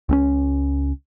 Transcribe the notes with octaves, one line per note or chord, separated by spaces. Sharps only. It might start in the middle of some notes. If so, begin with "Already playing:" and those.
C#2 C4 C#4